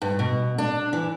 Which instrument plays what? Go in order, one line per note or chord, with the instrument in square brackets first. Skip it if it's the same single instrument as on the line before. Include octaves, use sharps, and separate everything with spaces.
[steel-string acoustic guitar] G2
B2
D4
E3